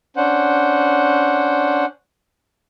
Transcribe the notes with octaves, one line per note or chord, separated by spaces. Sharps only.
C#4 D4 C5 F#5